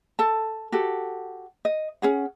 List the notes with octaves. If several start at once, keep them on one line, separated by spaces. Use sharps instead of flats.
A4 A5
F#4 G4 A4
D#5
C#4 G#4 F#5